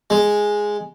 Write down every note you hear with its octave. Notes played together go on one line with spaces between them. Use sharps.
G#3